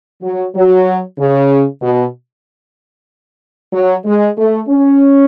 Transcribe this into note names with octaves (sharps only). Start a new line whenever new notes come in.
F#3
F#3
C#3
B2
F#3
G#3
A3
C#4